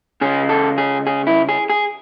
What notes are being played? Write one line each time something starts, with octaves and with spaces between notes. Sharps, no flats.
C#3 G#3 G#4
A4
G#4
G#4
E4
G#4
G#4